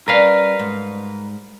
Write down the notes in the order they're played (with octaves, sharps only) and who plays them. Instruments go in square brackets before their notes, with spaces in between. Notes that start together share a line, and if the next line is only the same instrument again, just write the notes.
[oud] G3 C#4 [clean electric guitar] A#4 B4 F5
[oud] G#2